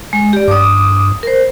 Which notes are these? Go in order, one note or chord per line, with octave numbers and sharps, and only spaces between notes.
G#3
G4 D5
G2 D6 D#6
A#4 C5